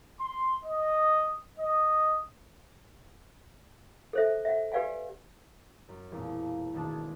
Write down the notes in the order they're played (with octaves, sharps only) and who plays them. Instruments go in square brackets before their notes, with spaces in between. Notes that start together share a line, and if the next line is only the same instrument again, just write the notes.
[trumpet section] C6
D#5
D#5
[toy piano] A4 C5 E5
E5 F#5
G4 B4 D5 F5 F#5 G#5
[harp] F#2
E1 F2 A#2
G#1 B2 A3 D4 A5
G#6